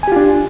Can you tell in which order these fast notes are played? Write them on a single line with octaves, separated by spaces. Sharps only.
G#5 G4 F4 D4